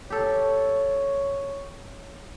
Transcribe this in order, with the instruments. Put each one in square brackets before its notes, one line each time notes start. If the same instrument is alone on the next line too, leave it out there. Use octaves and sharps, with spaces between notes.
[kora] G4 A4 [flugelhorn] C#5